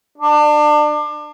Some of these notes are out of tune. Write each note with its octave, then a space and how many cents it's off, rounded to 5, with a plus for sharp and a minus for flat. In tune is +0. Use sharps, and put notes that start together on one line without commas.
D4 +30